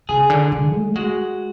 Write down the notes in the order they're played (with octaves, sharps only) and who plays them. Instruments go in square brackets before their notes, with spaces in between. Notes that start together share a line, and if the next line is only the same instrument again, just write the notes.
[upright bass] C#3 [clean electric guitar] G#4
[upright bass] D3
D3
A3
[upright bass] G#3 [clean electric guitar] F#4